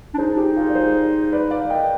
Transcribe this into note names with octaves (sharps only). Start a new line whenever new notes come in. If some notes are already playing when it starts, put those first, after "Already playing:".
D4
D#4 G#4 C5
G4
F4 G#4
D5
G#4 C5
B4 D5
D5 F5
D#5 G5